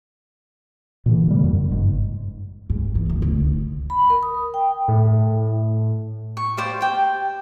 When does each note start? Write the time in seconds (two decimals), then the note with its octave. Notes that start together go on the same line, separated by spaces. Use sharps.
1.06 A#2 D3 E3
1.28 G3 A#3
1.39 F#2 C#3
1.53 F#2
1.70 G1 G#2
2.70 G#2
2.95 E3
3.10 D2
3.22 D2
3.40 D#3
3.90 B5
4.10 A#4
4.23 D#6
4.54 G5
4.88 A2
6.37 C#6
6.57 G4 C5 D5 F5
6.81 G4 G5